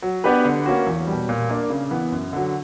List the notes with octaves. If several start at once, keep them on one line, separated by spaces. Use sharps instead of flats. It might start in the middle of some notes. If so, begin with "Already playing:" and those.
F#3
B3 D4 G4 B4
D3
A#3 C#4 F#4
E2
G3
B2
A#2
A#3 D4
C#3
E3 B3
F#2
D3 F#3